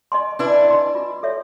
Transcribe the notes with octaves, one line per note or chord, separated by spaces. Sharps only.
D#5 G#5 C6
D4 E4 B4
D#5 G#5 C6
F4
A4 C#5 E5